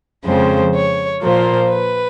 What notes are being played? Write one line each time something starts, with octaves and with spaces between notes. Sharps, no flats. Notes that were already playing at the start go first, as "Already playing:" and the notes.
F2 C#3 F3 G#3 C4 C5
C#5
A#2 F3 A#3 C5
B4